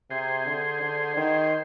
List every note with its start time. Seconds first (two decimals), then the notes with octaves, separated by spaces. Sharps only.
0.11 C3 G#4 C5
0.46 D3
0.82 D3
1.17 D#3